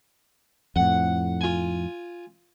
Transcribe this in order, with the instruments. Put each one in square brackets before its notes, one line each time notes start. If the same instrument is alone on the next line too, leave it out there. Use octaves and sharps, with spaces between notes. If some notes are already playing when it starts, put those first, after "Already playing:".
[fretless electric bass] F2 A2 [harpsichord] F#5
[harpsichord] F4 G#5